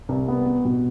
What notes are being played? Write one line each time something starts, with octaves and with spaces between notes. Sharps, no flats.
C2
B3
B3
B2